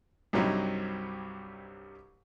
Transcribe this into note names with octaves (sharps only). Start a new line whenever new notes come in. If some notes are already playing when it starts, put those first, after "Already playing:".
C2 G2 C3 F#3 C4 D#4